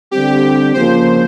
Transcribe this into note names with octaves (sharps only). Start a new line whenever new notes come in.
D3 G3 C4 G4
C#3 F3 A#3 C5